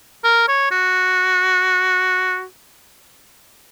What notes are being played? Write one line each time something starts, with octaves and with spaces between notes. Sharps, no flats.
A#4
C#5
F#4